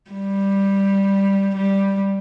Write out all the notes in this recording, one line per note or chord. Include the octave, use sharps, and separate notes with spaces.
G3
G3